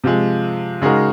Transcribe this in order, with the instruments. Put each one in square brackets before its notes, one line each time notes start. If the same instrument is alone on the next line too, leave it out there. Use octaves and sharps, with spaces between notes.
[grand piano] C3 F3 G#3
C#3 G#3 D#4 F#4 A#4